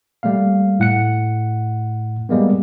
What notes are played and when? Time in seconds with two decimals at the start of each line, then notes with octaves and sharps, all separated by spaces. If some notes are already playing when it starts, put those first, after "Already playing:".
0.23 G3 A3 A#3 F5
0.79 A2 F#5 C#7
2.29 G3 G#3 A#3 B3